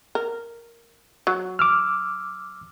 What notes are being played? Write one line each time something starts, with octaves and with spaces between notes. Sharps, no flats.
A#4
F#3
D6 E6 F6